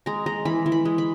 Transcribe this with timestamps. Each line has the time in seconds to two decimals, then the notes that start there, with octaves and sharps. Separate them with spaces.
0.06 G#3 A#5
0.26 G#3 A#5
0.45 E3 B5
0.66 E3
0.72 B5
0.85 G#3
0.98 B5